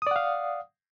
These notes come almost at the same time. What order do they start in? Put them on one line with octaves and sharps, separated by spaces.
D#6 D5 F#5 F5